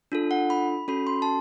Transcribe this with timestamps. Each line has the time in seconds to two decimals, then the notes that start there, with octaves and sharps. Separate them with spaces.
0.12 D4 F4 A4
0.31 F#5
0.50 B5
0.88 C#4 F#4 A4 B5
1.07 C6
1.22 A5